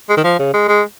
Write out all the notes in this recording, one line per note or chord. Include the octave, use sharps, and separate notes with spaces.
G#3
D#3
F3
C#3
G#3
G#3